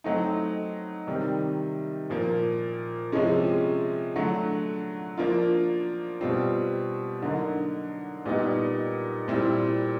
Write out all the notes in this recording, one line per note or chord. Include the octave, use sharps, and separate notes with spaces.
F#3 A3 C4 D#4
C3 D#3 G3
A#2 F3 A#3
C3 F3 G#3 C#4
D3 F#3 A3
F3 A#3 D4 F4
B2 G3 C4 F4
D3 F#3 A#3 D#4
A#2 G3 B3 D#4
A#2 G3 C4 E4